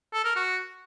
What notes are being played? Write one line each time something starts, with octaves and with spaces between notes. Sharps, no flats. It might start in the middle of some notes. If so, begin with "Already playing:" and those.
A4
A#4
F#4